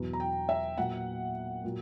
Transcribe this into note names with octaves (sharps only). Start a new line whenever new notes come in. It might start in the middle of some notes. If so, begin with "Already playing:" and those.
Already playing: E2 B2 F#3
A#5
G5
E5
A#2 F#3 F#5
A#2 F#3